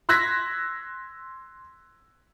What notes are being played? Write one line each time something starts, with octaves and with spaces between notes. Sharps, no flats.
C6 E6 F#6 G#6 A#6 B6